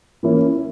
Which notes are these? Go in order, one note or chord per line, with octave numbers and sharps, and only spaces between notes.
E3 A#3 C#4 E4